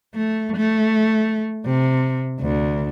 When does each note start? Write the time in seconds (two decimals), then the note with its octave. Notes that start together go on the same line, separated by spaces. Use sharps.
0.15 A3
0.56 A3
1.66 C3
2.40 D2